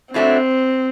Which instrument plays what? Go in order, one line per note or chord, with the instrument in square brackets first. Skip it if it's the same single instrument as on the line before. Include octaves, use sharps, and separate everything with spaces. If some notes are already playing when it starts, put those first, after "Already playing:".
[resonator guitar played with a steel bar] A2 F#3 A3 D4 [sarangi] C4